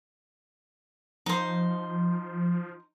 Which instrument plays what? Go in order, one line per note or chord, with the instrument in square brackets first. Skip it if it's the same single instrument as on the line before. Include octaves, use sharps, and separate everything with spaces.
[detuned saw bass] F3 [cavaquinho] D#4 C5